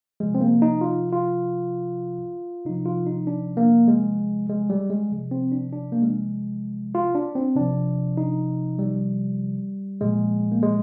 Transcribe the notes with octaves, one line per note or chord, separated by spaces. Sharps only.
C3 F3 G#3
C4
A#3
D#4
F4
F4
C3 F3 D#4
F4
D#4
D4
A#3
G#3
G#3
G3
G#3
C3 F3
C4
D4
D4
A#3
G#3
F4
D4
C4
C3 F3 D4
D#4
G3
A#2 F3 G#3
A#3
G#3